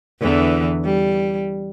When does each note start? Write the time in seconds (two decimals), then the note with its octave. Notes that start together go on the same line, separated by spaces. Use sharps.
0.21 E2 D3 E3
0.85 G3